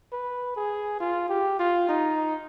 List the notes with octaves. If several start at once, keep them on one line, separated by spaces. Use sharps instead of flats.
B4
G#4
F4
G4
F4
D#4